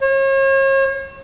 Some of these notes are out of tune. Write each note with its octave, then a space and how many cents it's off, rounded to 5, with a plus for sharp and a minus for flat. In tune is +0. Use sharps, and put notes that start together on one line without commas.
C#5 -40